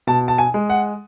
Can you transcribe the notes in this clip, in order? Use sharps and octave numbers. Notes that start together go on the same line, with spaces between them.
B2 A5
A5
G#5
G#3
F#5